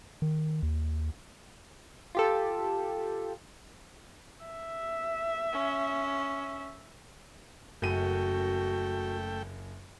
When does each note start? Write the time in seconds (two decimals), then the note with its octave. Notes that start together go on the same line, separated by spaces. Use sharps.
0.22 D#3
0.63 D#2
2.15 F4 G4 A4
4.45 E5
5.53 C#4
7.82 F#1 F#2 A3 F#4 G5 D#7